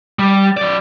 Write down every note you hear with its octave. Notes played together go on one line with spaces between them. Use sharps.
G3
F#3 D5